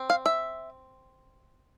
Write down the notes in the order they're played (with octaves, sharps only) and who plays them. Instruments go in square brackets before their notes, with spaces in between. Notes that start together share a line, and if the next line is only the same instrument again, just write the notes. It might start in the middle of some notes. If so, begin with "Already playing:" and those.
Already playing: [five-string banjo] C4
F5
E5